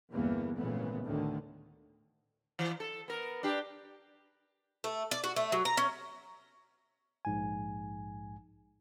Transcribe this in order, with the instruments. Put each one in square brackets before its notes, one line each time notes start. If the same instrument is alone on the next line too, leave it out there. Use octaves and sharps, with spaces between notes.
[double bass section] G1 E2 E3 G3 A#3 B3
G#1 A#2 C#3 E3 A3 B3
D2 A2 D3 D#3
[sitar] E3
A4
B3 A#4
D4 G4
[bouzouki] A3
D5
F#4
A3
F#3
A#5
C#4
[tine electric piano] A#1 G#2 G#5